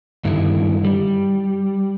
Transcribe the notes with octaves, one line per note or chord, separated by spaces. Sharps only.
G2 D3 D#3 E4
G3